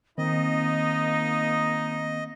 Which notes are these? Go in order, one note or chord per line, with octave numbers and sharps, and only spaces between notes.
D#3 A#3 C4 D#4 D#5